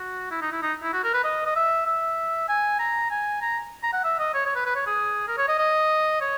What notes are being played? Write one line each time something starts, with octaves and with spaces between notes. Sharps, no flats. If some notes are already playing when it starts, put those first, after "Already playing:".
Already playing: F#4
E4
D#4
E4
D#4
E4
F#4
A#4
B4
D#5
D#5
E5
E5
G#5
A#5
G#5
A#5
A#5
F#5
E5
D#5
C#5
C#5
B4
B4
C#5
G#4
A#4
C#5
D#5
D#5
C#5